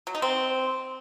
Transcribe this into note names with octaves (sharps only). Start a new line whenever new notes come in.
F#3
D#4
C4